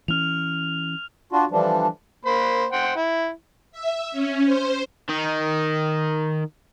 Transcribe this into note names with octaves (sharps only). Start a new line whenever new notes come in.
E3 C4 C#4 F6 F7
D4 F4 F#4
D3 E3 F3 G3 D4
A#3 C5 B5
C5 F#5 G5
E4
E5
C#4
C5
D#3 D#4